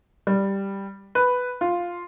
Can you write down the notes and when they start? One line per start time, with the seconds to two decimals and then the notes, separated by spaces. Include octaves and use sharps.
0.27 G3
1.15 B4
1.61 F4